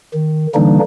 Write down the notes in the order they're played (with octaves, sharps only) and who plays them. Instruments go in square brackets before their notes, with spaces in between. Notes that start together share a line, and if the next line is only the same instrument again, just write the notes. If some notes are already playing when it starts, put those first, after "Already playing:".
[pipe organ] D#3
D3 E3 G3 A#3 D4 D#4